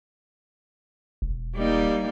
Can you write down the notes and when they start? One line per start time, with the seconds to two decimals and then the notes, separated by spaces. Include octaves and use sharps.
1.22 E1
1.54 G3 A#3 D#4